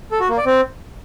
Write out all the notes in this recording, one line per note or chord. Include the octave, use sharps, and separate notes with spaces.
A4
F#4
A#3
D5
C4